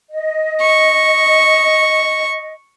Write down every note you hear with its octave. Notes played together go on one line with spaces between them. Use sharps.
D#5
C#6